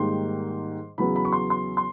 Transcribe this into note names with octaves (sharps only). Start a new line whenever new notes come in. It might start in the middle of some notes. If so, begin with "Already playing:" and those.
Already playing: G#2 D#3 G3 A#3 C6
E2 C#3 F#3 B3 B5
B5
C#6
C6
C6
C6